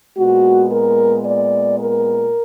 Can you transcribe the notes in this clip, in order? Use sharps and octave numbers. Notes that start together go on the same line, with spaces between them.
A#2 G#3 B3 F#4
A#4
D5
A#4